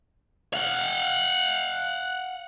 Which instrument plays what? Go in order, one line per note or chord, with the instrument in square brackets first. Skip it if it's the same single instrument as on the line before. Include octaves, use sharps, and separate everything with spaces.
[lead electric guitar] F5 F#5